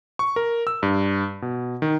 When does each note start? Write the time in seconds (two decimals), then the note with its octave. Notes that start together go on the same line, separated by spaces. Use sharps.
0.19 C#6
0.36 A#4
0.67 E6
0.83 G2
1.42 B2
1.82 D#3